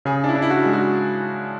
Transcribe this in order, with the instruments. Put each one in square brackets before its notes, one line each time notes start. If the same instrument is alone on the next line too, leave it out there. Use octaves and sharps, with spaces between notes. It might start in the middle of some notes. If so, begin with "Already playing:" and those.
[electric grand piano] C#3 [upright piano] G#4
[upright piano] D4
E4
[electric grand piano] D4
[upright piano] E4
F#4
[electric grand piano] G#3
[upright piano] F#4